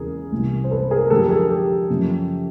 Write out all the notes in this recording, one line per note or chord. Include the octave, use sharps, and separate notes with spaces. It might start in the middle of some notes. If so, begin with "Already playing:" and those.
Already playing: E2 C#3 E3 G#4 A#4
C2 C3 E3
C5
A4 B4
G#4 A#4
A#4
F#2 D3 F3 G4 A4
G#4 A#4
G4 A4
F#2 C#3 F3